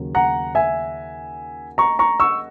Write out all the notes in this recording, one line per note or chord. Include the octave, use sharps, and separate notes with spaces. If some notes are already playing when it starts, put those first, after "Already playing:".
Already playing: D#2 C#3 F#3
F#5 A#5
E5 G#5
A#5 C#6
A#5 C#6
C#6 E6